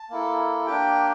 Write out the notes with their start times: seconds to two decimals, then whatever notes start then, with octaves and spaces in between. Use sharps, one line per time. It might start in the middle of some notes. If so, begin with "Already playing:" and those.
Already playing: A5
0.10 A#3 E4 A4
0.67 A#3 D4 G4 G5